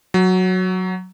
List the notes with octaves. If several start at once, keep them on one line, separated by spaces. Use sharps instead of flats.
F#3